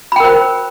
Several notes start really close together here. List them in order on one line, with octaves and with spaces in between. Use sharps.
B5 G5 A#4 C5